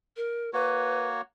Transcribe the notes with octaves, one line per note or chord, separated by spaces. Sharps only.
A#4
A#3 F#4 B4 C#5